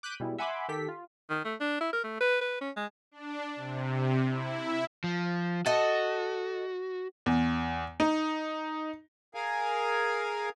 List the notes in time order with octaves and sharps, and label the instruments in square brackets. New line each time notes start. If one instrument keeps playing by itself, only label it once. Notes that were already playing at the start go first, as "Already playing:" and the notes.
[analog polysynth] D6 F#6 G6 B6 D#7
B2 G3 G#3 E4
E5 F#5 G#5 B5 C6 D6
D#3 G4 A4 B6
F4
[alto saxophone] D#3
A3
D4
E4
A#4
A3
B4
B4
C#4
G#3
[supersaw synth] D4
C3
E4
[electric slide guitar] F3
[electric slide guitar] F#4 [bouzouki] A4 D#5
[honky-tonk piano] E2
D#4
[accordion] G#4 A#4 F5 G#5